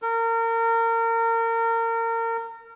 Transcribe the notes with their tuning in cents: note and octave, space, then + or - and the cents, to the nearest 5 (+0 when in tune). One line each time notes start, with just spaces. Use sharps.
A#4 -30